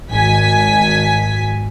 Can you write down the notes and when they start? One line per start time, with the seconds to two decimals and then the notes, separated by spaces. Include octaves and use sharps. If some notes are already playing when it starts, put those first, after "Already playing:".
0.11 G#1 G#5 B6